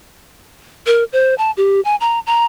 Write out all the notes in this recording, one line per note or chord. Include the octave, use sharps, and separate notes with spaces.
A#4
C5
A5
G4
G#5
A#5
A#5